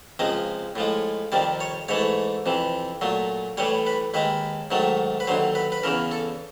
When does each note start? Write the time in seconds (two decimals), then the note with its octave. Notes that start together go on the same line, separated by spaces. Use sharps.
0.19 C#2 C3 F3 G#3 D#5
0.76 A2 F3 G#3
1.32 F2 C3 D#3 G3 D5
1.60 C#5
1.88 G#2 E3 A3 C#5
2.46 F2 C3 E3
3.01 A#2 F#3 A3
3.57 A2 E3 G3 C#5
3.87 B4
4.14 D#2 D#3 G#3 B4
4.71 G#2 D#3 F#3 A3
5.20 B4
5.27 D#2 D3 F#3 C5
5.55 B4
5.72 B4
5.83 E2 C#3 E3 A#4
6.11 A4